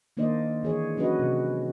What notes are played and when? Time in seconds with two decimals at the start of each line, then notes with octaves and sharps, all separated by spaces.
0.17 D#3 A#3 D4 C5 D5 D#5
0.63 E3 G#4 C#5
0.97 F#3 C#4 D4 F#4 B4 D#5
1.19 C3